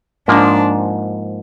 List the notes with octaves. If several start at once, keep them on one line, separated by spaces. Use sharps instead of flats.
G#2 F3 A#3 D4